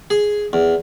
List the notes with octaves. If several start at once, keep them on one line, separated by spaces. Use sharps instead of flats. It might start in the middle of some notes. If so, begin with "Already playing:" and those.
G#4
E2